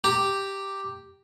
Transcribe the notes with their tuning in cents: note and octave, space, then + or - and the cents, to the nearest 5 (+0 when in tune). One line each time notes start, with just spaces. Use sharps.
G4 +0 A#5 -30